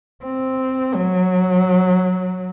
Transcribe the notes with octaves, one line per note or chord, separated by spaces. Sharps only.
C4
F#3